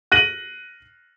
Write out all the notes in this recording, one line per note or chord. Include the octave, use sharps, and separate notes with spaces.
F#6 A#6 D#7 F#7